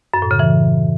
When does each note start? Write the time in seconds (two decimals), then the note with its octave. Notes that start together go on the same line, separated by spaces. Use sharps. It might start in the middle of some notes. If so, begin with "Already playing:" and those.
0.14 F#2
0.22 A2
0.31 C#3
0.39 E3